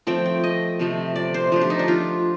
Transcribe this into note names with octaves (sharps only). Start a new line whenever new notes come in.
F3 A3 C4 G5
G5
D#5
C3 F3 A3
D5
C5
F3 A3 D4
G4
D#4
D4
F4